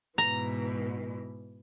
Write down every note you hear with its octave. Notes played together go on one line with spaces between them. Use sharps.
G#2 B2 E3 A#5